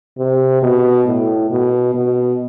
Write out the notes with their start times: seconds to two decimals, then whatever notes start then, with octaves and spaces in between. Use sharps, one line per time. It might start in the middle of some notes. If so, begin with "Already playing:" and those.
0.18 C3
0.62 B2
1.07 A2
1.50 B2
1.95 B2